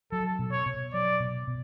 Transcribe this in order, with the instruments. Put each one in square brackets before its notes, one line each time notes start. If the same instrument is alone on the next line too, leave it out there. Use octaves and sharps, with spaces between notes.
[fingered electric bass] F#3 [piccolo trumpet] A4
[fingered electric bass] B2
[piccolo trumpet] C#5
[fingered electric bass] B2
[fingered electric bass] F#3 [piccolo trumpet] D5
[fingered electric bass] B2
B2